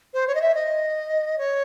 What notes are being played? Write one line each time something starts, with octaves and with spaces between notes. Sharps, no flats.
C5
C#5
D#5
E5
D#5
C#5